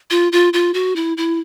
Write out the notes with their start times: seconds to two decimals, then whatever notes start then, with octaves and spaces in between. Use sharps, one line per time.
0.11 F4
0.32 F4
0.53 F4
0.74 F#4
0.96 E4
1.17 E4